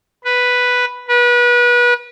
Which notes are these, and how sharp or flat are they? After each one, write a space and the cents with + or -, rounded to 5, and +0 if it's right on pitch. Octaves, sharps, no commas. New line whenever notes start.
B4 +0
B4 -30